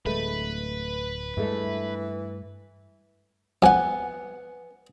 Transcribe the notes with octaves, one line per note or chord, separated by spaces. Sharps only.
D1 G#3 A3 B4
G2 E3 G#3 A3
F2 B3 F#5 G#5